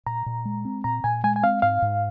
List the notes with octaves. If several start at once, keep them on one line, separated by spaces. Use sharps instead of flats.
A#2 A#5
A#2
G#3
C4
A#2 A#5
A#2 G#5
G#3 G#5
G#5
C4 F5
G#2 F5
G#2